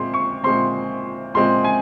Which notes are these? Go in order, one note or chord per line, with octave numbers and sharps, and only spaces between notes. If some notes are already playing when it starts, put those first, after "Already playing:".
Already playing: A#2 G#3 C4 C6
C#6
A#2 G#3 C4 C6
A#2 G#3 C4 C6
G#5